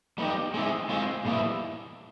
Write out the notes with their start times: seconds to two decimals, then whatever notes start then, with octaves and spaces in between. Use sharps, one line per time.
0.18 G3 B3 D#4 G4
0.54 G#3 C4 E4 G#4
0.89 G#3 C4 F4 G#4
1.25 A#2 G3 B3 E4